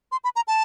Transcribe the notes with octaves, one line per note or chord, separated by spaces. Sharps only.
C6
B5
A#5
A5